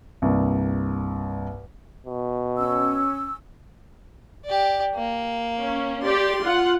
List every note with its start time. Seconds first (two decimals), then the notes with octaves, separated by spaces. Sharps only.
0.22 C2 G2 A#3
2.06 B2
2.58 C#4 E6
4.45 G4 D5
4.95 A#3
5.59 C#4
6.02 G4 D5 C6
6.43 F4 F#5